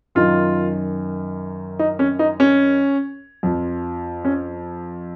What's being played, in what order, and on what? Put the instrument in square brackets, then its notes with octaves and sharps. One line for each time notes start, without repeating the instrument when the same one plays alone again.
[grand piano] F#2 D#3 F4
D#4
C#4
D#4
C#4
F2 F3
C#4